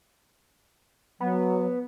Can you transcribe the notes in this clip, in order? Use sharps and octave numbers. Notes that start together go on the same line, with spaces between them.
F#3 B3